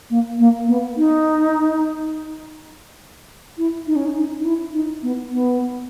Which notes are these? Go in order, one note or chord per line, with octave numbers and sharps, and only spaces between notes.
A#3
A#3
B3
D#4
E4
D#4
C#4
D#4
D#4
D#4
E4
D#4
B3
B3